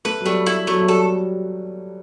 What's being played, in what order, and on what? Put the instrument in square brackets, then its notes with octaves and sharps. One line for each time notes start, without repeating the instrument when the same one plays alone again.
[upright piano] A3 [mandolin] B4
[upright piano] F#3
[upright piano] G3 [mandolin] A3
[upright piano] G3 [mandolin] E4
[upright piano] F#3 [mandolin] A3
[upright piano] F#3
[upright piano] G3 [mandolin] A4